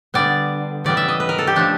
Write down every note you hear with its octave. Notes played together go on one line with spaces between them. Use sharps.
D3 G3 B3 D5
C#3 E3 G3 B3 D5
E5
D#5
B4
A#4
A4
G4
C#3 F3 A3 D4